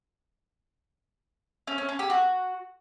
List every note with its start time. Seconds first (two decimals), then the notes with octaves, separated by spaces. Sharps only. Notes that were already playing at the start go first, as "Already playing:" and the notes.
1.67 C#4
1.78 C#4
1.89 C#4
1.99 G4
2.10 F#4